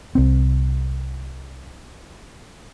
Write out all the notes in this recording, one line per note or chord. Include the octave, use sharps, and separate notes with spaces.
C2 C4